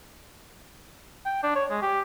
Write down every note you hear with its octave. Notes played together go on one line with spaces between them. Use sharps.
G5
D4
C#5
G#3
G4